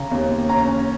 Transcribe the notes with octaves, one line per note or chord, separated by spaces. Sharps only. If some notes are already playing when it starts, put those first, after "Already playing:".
Already playing: C#3 C#4 A#5
D#2
D#2
C#4 A#5
C#4